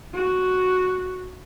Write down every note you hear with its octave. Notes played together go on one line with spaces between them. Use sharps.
F#4